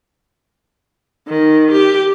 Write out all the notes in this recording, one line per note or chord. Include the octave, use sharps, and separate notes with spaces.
D#3
G4